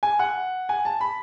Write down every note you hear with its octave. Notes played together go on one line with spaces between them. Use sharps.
G#5
F#5
G#5
A5
B5